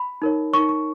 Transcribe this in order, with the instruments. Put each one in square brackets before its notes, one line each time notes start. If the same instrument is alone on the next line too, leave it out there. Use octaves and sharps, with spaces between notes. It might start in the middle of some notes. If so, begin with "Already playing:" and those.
Already playing: [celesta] B5
D#4 A#4 C#5
D#4 A#4 C#5 C#6
C#6